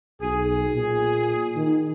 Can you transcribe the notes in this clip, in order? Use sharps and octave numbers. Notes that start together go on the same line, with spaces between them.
B1 G#4
A#2
D#3